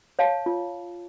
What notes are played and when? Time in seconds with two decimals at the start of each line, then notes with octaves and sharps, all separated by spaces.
0.19 C#5 F5 A5
0.46 F4